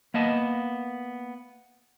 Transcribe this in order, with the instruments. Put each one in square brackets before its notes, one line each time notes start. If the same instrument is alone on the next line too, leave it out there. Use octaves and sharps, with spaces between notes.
[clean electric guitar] A#3 B3 D#5 A5